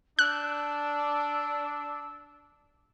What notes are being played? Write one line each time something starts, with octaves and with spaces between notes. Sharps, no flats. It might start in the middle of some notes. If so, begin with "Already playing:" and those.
D4 E6 F#6